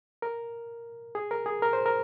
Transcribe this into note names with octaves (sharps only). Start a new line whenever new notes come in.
A#4
G#4
A#4
G#4
A#4
C5
A#4